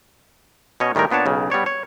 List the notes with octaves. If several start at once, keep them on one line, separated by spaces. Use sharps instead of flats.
B2 C#4 C#5 D#5
A2 D#3 G3 G#3 A#4
A#2 B3 D4 C#5 A5
B1 C#3
G3 B3 C#5 D5
C#5